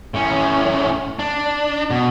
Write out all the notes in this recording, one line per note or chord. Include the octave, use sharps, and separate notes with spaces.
A2 C#4
D4
B2